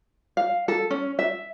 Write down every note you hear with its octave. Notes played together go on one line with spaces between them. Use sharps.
F5
A4
C#4
E5